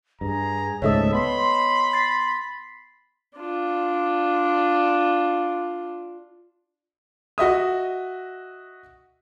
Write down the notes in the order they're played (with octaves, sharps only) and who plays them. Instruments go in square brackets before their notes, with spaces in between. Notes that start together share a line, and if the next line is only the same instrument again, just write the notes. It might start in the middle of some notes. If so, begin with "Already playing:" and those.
[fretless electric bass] G2 [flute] G#4 [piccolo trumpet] A#5
[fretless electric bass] C#2 G#2 A3 [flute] A4 [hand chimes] C#5 D#5 D#6 [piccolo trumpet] E5
[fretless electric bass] B3 [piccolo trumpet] B5 [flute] C6
[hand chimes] A6 B6 C7
[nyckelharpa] D4 F4
[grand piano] F#4 D#5 E5 D#6